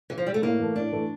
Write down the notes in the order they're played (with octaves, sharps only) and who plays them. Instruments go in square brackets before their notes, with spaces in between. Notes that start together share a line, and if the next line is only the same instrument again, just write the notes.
[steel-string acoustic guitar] E3
F3
G3
A3
[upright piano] A2 [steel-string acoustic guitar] A#3
[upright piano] E3 A3
[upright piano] A2 [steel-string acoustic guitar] D4
[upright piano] E3 A3